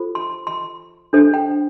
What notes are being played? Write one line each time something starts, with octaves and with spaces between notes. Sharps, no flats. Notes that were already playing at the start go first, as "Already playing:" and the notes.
Already playing: F4 A4 C5
C6
C6
D4 A4 C5
G5